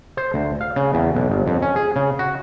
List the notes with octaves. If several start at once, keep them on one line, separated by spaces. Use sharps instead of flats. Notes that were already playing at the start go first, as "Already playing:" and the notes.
C5
D2
F5
C#3
E2
B1
G1
F2
C#4
G#4
C#3
F#4